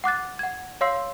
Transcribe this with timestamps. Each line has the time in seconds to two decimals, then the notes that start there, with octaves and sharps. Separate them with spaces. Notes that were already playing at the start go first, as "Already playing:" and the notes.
0.04 F#5 D6 F#6 A6
0.39 F#5 G#6
0.81 C#5 F5 C6 E6 C7